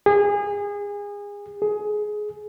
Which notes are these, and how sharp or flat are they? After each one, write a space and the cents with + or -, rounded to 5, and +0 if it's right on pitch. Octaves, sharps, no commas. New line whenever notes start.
G#4 -30
G#4 +15